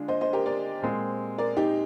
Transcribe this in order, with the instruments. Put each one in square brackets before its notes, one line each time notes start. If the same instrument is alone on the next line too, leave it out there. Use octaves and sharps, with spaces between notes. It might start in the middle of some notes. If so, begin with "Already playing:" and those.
Already playing: [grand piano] D3 G#3 D4 F4
[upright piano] C5 D#5
C5 D#5
G4 A#4
A#4 D5
[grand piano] A#2 G#3 C4
[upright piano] A#4 D5
D#4 G4